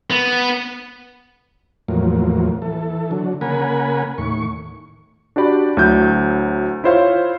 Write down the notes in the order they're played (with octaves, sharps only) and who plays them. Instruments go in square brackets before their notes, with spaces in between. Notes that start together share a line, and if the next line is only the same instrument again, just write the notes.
[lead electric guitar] B3
[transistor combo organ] E2 A2 F3 F#3 A#3
E3 A4
D3 F#3
C#3 A#3 A#4 F#5 G#5 B5
D#2 A2 C#6
[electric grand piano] D4 F#4 G4 D5 B5
D2 F#3 E4 G6
E4 F4 C5 C#5 F5